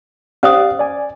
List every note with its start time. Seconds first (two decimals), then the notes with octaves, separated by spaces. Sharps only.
0.43 C#4 G4 C5 D5 F5 D#6
0.79 D5 G#5